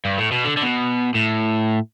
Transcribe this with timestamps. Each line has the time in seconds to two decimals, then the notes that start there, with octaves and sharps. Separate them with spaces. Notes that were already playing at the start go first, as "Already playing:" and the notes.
0.05 G2
0.18 A2
0.31 B2
0.44 D3
0.57 D3
0.62 B2
1.14 A2